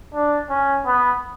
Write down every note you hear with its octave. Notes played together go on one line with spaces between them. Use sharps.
D4
C#4
B3